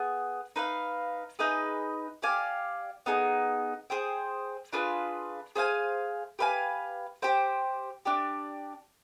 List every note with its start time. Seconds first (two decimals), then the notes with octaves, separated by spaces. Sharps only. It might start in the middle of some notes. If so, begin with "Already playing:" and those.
Already playing: B3 G#4
0.56 D#4 B4 F5
1.39 D#4 G#4 B4 D#5
2.22 G4 D5 F5 G#5
3.06 B3 D#4 G#4
3.90 G#4 C5 G5
4.73 D4 F4 G#4 B4
5.56 G#4 C5 F5 G#5
6.39 G4 B4 F5 G#5
7.22 G4 C5 G5
8.05 D4 G4 D5